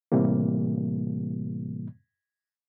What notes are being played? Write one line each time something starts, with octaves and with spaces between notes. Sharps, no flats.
A2 C3 E3 G3 A#3